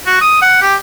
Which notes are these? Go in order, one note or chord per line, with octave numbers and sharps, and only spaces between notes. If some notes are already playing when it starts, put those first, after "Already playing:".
F#4
D#6
F#5
G4